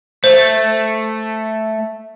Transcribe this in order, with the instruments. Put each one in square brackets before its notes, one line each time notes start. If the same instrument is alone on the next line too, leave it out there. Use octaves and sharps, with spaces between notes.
[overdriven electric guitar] A3 [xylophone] C5